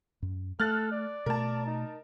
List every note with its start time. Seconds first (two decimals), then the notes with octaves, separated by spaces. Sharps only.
0.22 F#2
0.60 A3 A4 F6 F#6 A6
0.92 D5
1.26 B2 A3 A#4 A5
1.65 D#4